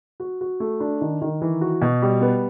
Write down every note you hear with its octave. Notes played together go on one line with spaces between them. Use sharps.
F#4
F#4
A3
D4
D#3
D#3
E3
F#4
B2
G3
B3